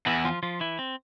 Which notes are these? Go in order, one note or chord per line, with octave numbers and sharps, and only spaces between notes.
E2 E3 E4
F3 F4
F3 F4
E3 E4
C4